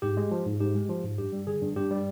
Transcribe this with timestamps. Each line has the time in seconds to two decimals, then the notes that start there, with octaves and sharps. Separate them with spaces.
0.02 G#2 G4
0.17 G#3
0.31 F3
0.46 G#2
0.60 G#2 G4
0.75 G#3
0.89 F3
1.04 G#2
1.18 G2 G4
1.32 G3
1.47 D3 G#4
1.62 G2
1.76 G2 G4
1.90 G3